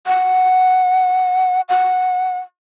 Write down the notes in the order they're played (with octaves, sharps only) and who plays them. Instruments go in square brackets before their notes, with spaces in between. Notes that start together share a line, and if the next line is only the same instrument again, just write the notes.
[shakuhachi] F#5
F#5